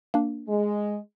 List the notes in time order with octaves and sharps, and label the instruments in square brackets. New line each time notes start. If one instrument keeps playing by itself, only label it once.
[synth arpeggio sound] A#3 D4
[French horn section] G#3